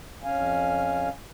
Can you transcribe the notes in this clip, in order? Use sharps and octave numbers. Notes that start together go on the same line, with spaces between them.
F2 C#4 F5 G#5